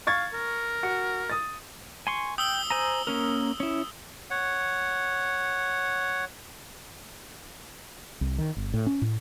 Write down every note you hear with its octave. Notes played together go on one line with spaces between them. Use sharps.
F5 C#6 G#6 A6
A#4
F#4 C#7
D#6 A6
G#5 C6 C#6
G5 D#6 E6 G7
C5 G#5 A#5
A#3 C#4 A#4
C#4 E4
C#5 F#5
C2
D#3
G1
A2
C#4
A2